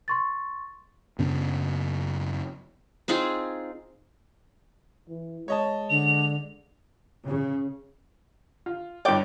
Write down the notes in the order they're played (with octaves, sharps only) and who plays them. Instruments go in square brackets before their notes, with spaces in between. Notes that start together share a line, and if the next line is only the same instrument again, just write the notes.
[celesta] C6 C#6 A6
[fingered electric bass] F#2 C#3 B3 D4
[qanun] C4 D#4 F4 G#4
[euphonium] E3
[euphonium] G#3 [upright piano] C#5 D#5 A5
[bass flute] D3 [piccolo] F7
[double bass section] C#3
[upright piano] F4
[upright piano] G2 C#5 [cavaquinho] D5 G5 D6